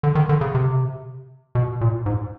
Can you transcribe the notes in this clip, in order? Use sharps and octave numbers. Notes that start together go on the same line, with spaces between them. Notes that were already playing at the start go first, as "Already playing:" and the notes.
D3
D#3
D3
C#3
C3
B2
A#2
G#2